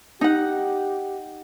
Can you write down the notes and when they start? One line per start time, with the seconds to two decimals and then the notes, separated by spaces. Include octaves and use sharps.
0.21 D#4 G4 F#5